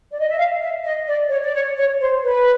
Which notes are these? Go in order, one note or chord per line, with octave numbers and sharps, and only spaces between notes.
D5
D#5
E5
F5
E5
D#5
D5
C#5
D5
C#5
C#5
C5
B4